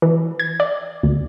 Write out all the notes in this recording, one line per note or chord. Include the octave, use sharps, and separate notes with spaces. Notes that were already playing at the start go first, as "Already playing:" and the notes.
E3
G#6
D5
D2